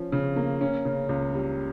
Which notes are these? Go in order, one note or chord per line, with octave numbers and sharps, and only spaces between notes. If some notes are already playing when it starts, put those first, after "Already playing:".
Already playing: F3 C#4
C#3
A#3
C#4
C#3
C#2
G3